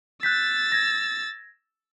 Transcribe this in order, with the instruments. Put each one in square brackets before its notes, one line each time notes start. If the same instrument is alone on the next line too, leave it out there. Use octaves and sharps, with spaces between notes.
[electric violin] E6 A6 [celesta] F#6 G6 B6
[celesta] G#6 A#6